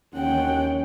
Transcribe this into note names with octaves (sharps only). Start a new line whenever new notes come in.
D#2 C#4 F#5 G5